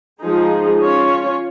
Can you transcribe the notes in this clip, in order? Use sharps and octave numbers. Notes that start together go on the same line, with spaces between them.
F3 G#3 D#4 G#4
C#4 F4 C#5